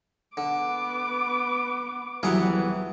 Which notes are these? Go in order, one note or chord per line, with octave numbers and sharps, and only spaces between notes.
D3 B3 D6
D#1 E3 F#3 B3 G#4 F#5